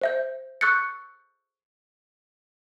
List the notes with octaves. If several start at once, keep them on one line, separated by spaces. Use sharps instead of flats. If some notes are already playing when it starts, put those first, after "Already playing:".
C5 E5 G6
C#6 E6 F#6 G6 A6 C#7